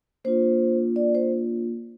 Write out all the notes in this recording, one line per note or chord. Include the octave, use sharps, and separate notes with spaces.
A#3 D4 F4 C5
D5
C5